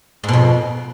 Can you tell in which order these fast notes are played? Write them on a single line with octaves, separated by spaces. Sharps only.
G#2 B2 F2